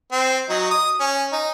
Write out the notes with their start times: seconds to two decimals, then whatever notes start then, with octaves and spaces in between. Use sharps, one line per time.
0.12 C4
0.49 F#3 D#4
0.71 D#6
1.00 C#4
1.33 D#4